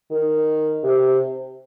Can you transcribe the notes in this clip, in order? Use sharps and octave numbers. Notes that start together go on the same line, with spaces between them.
D#3
C3